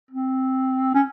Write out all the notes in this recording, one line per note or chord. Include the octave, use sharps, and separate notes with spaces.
C4
C#4